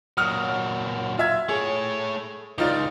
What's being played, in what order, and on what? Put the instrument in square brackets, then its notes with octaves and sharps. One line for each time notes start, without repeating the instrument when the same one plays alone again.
[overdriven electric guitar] A#2 F#3 [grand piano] D#6 F6
[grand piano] F4 E5 G#6
[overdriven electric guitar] A3 C#5 [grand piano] G#4
[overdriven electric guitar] C#2 [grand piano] D#4 F4 D5